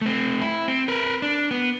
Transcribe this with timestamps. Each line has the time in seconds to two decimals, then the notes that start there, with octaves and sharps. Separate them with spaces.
0.01 A3 C4
0.41 E4
0.68 C4
0.88 A#4 B4
1.22 D4
1.51 B3